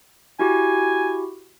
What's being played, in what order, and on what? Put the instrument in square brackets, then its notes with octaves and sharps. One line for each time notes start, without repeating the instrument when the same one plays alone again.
[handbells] E4 F#4 G4 [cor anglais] G#5